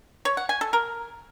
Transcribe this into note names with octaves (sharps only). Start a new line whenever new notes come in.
C#5
F#5
G#5
A4
A#4